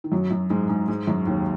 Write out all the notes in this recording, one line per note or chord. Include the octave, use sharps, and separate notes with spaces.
D#3
F#2 F#3
F#2 F#3
G#2 G#3
G#2 G#3
G#2 G#3
F#2 F#3
D#2 D#3